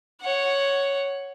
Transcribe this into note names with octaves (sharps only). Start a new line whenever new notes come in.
C#5 F#5